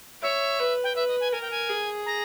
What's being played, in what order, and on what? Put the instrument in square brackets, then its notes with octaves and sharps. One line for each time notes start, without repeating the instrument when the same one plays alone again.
[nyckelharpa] C#5 [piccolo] E5
[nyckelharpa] B4
[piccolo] G5
[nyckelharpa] B4 [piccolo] E5
[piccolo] D#5
G#5
[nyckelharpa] A#4 [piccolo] G#5
[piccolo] G5
G#5
[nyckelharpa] G#4
[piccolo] A#5